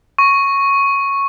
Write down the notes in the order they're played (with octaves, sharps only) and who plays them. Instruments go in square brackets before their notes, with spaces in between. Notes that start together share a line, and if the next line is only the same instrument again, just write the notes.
[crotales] C#6